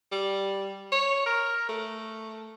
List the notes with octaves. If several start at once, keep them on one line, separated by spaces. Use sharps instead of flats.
G3
C#5
A#4
A3